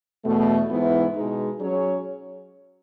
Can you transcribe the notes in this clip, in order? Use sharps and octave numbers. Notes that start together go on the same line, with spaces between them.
E2 B2 A3
G#2 E3 B3 E4
B2 G#3 D#4
F#3 C#4 G#4 C#5